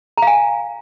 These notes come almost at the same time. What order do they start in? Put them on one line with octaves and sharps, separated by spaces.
A#5 F5 G#5